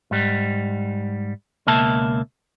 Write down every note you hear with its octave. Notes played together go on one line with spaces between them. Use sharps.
G#2 G3
C#2 B2 A#3 E5 A5